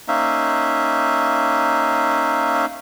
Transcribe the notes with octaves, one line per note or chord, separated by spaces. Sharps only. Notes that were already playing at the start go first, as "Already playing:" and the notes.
A#3 C#4 D#4 E5